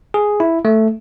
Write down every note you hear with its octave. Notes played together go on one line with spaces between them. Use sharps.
G#4
E4
A3